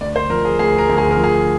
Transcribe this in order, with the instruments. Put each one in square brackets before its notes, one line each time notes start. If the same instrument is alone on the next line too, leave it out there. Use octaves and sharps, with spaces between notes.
[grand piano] D2 D5
C5
F3 A#4
G#4
D2 G#4
A#4
D2
G#4
A#4
F3
G#4